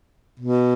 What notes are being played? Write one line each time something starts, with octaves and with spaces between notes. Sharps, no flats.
B2